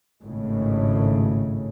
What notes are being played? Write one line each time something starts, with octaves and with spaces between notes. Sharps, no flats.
G#1 A2 C#3